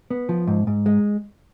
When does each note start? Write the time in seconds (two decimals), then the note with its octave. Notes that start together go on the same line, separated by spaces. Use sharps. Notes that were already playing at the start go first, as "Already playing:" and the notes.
0.11 B3
0.29 F3
0.47 G#2
0.67 G#2
0.86 G#3